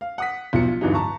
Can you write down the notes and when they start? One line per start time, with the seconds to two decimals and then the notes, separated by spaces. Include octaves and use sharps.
0.01 F5
0.18 F#5 D#6 B6
0.53 B1 F3 F#3 C#7
0.68 F4
0.81 D1 G2 E3 F#3 D#4
0.94 A5 A#5 C#6